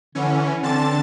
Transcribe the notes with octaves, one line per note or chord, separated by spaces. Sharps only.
D3 E3 C#4
D3 C4 A5 A6